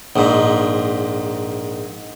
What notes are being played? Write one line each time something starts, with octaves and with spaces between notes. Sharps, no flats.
A#1 G#2